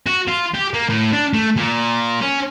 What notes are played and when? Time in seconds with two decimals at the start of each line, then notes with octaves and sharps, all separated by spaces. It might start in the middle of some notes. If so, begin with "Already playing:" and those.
0.06 F#4
0.28 F4
0.54 G4
0.74 A#3
0.89 A2
1.13 D4
1.34 A3
1.56 A#2
2.21 C#4